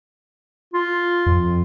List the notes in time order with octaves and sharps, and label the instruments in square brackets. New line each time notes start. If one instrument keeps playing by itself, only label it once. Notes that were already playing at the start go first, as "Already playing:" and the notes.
[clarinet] F4
[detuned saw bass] F2